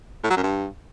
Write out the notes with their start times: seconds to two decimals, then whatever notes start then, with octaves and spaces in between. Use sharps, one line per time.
0.24 A2
0.30 F#3
0.37 F#2
0.43 G2